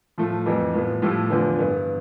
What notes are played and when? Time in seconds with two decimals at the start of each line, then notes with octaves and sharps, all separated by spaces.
0.18 A2 F3 A3
0.46 F2 E3 G3
0.74 A2 F3 B3
1.02 A2 F3 A3 E4 G4
1.30 E2 D3 F3 B3
1.59 G2 E3 B3